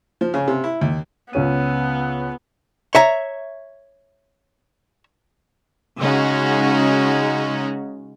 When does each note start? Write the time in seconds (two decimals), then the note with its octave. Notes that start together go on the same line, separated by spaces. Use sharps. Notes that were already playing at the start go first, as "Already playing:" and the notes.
0.21 F3
0.34 C#3
0.48 C3
0.64 E4
0.82 D#2
1.33 C#2 B3 C#4 D#7
2.95 C#5 E5 A#5
5.98 C#3 G#3 C#4 D#4 F#4